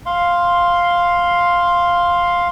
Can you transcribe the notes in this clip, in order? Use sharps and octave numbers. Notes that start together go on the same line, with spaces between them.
F5 C6